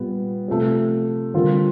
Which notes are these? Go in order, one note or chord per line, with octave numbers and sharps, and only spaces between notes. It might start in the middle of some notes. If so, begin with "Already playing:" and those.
Already playing: A#2 G3 B3
C3 F3 A3
D3 G3 C4 F4 A#4